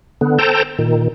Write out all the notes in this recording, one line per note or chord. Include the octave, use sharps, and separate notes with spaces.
D3 B3
A4 C5 G5 A5 A#5
A#2 D#3